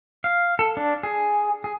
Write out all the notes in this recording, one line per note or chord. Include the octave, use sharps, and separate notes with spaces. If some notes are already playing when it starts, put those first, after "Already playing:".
F5
A4
D4
G#4
G#4